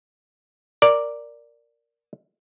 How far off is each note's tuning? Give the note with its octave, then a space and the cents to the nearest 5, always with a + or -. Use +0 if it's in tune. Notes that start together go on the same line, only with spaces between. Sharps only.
A#4 +0 D5 +0